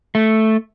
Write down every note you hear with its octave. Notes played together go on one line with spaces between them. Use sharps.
A3